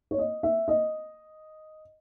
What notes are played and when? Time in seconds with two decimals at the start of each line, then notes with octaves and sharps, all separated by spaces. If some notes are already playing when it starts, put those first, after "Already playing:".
0.11 C#5
0.18 D#5
0.43 E5
0.68 D#5